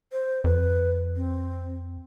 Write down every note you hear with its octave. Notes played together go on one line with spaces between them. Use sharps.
C5
F2 B4
C4